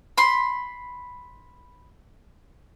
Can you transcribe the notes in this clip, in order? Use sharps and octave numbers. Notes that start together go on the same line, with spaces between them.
B5 C6